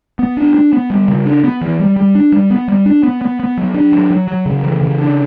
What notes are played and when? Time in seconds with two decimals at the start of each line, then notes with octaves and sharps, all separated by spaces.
0.19 B3
0.37 D4
0.54 D4
0.73 B3
0.90 G3
1.08 C#3
1.26 D4
1.44 B3
1.61 E3
1.80 G3
1.96 G3
2.15 D4
2.32 G3
2.50 B3
2.68 G3
2.86 D4
3.03 B3
3.21 B3
3.40 B3
3.57 F#3
3.75 D4
3.92 F#3
4.11 F#3
4.28 F#3
4.46 C#3
4.64 E3
4.81 C#3
4.99 D4